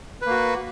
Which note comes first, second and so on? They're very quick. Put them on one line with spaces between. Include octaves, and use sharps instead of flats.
B4 A#3 F#4